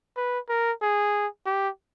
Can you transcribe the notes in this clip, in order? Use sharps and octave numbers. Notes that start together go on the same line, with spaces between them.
B4
A#4
G#4
G4